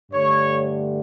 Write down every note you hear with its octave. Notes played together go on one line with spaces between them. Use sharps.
G2 D3 A3 C#5